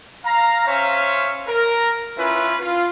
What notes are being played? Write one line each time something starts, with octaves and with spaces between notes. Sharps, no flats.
F5 A#5
C#4 C5 C#5 E5 F5
A#4
C#4 E4 F4 B4
F4